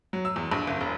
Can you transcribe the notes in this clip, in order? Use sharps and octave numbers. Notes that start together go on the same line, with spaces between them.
F#3
E6
E2
A#1
F#1
E1